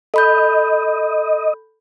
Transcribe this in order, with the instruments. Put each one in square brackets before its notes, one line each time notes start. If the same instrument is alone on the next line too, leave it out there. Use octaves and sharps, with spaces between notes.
[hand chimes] A4 B5 G6 [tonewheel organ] D#5